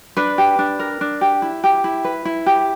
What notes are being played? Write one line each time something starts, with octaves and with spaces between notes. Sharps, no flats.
D4 B4
G4
D4
A#4
D4
G4
E4
G4
E4
B4
E4
G4